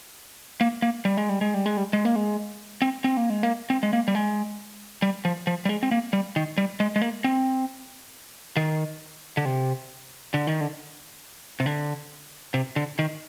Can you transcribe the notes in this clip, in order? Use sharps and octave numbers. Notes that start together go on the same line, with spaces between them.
A#3
A#3
G3
G#3
G3
G#3
G3
G#3
G3
G#3
A#3
G#3
C4
C4
A#3
G#3
A#3
C4
G#3
A#3
G3
G#3
G3
F3
F3
G3
G#3
C4
A#3
G3
D#3
G3
G#3
G#3
A#3
C4
D#3
D3
C3
D3
D#3
D3
C3
D3
C3
D3
D#3